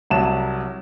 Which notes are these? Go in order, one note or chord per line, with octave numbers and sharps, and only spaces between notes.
C2 F#3 A5 E7